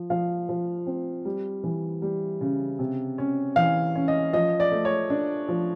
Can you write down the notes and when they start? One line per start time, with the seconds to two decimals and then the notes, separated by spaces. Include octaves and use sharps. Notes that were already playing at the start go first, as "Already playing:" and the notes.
Already playing: F3
0.10 F3 F5
0.49 F3
0.86 C4
1.25 G3
1.64 E3
2.02 G3
2.41 C#3
2.79 C3
3.18 C#4
3.56 E3 F5
3.95 C#4
4.08 D#5
4.33 F3 D#5
4.60 D5
4.71 A3
4.85 C#5
5.10 D4
5.48 F3